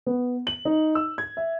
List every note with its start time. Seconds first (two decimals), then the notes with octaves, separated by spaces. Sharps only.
0.07 B3
0.47 F#7
0.65 D#4
0.95 E6
1.18 G#6
1.37 E5